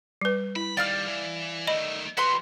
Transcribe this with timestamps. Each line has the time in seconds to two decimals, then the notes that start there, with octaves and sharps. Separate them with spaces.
0.21 G3 B4
0.56 E4 B5
0.77 D#3 G3 D5 F5 F6
1.08 E3
1.67 D#3 A3 D#5 B5
2.17 G3 F#4 B4 B5 C6